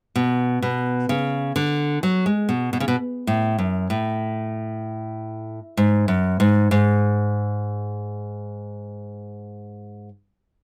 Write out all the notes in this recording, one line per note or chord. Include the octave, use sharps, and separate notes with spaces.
B2
B2
C#3
D3
F#3
G#3
B2
B2
C#3
B2
A2
F#2
A2
G#2
F#2
G#2
G#2